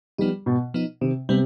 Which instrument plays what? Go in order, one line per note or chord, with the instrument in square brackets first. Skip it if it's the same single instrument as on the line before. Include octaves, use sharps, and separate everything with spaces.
[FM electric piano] F3 B3 D#4 [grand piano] G3
[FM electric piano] G#2 [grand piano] B2
[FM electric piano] F3 B3 D#4
[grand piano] C3 [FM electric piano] D#3
[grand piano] C3 [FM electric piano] G3 B3